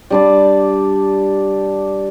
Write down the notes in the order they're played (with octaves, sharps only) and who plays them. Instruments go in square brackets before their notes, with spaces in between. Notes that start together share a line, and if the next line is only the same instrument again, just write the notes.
[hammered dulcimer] G3 D4 D5